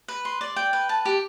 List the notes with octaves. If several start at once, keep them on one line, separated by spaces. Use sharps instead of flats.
B4
C6
D5
G5
B4
A5
G4